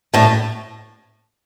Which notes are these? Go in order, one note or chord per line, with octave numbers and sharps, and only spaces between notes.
A2 A3